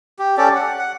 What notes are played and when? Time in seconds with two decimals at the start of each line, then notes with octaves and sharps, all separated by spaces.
0.19 G4
0.37 C#4 G4 A4 D5
0.55 F#5
0.78 F#5